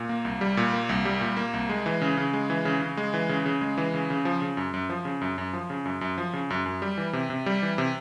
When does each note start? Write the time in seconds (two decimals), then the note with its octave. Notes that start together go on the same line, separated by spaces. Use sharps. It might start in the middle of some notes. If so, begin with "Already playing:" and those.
Already playing: A#2
0.09 A#3
0.25 C2
0.41 G3
0.57 A#2
0.73 A#3
0.89 C2
1.05 G3
1.21 A#2
1.37 A#3
1.54 C2
1.69 G#3
1.86 E3
2.01 C#3
2.17 C#3
2.33 G#3
2.50 E3
2.65 C#3
2.82 C#3
2.97 G#3
3.14 E3
3.29 C#3
3.45 C#3
3.61 G#3
3.78 E3
3.94 C#3
4.10 C#3
4.25 F3
4.42 C#3
4.57 F#2
4.74 F#2
4.90 F3
5.05 C#3
5.21 F#2
5.38 F#2
5.53 F3
5.70 C#3
5.85 F#2
6.01 F#2
6.18 F3
6.33 C#3
6.50 F#2
6.66 F#2
6.82 G3
6.98 E3
7.13 C3
7.30 C3
7.46 G3
7.62 E3
7.78 C3